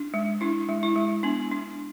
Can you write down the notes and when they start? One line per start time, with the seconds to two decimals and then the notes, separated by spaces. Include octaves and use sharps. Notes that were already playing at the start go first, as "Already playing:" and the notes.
Already playing: D4
0.14 G#3
0.41 D4 E4
0.68 G#3
0.83 E4
0.96 G#3
1.23 B3 D4
1.51 D4